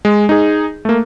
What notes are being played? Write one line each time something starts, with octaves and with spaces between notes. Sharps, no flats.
G#3
D#4 G#4
A3 A#3